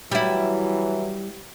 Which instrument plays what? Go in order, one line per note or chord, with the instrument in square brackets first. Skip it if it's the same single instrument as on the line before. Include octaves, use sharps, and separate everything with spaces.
[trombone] E3 [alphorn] F#3 [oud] G3 E4